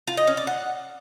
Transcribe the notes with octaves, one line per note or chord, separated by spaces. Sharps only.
F4
D#5
C#4
D5
F#5